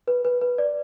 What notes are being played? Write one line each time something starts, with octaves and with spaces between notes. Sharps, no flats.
B4
B4
B4
D5